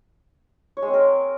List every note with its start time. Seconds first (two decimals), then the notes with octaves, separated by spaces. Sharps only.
0.77 C#5
0.82 G#3
0.88 C4
0.94 A#4